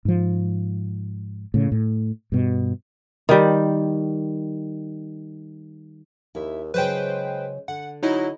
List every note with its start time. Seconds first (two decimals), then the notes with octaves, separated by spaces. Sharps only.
0.05 G#2 F3
1.54 A2 C#3
1.72 A2
2.32 G2 B2
3.29 D#3 G3
6.35 D#2 E4 E5
6.74 C#3 F#3 G#3 B4 C5 G5
7.68 D3 F#5
8.03 F#3 D#4 E4 D#5